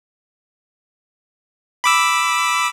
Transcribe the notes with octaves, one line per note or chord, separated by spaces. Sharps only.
B5 D6 E6